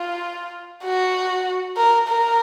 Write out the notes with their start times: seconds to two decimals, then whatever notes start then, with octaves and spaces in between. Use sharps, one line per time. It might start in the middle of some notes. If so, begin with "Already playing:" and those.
Already playing: F4
0.85 F#4
1.77 A#4
2.08 A#4